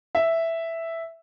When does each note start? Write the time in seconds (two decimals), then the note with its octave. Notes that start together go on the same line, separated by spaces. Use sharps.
0.15 E5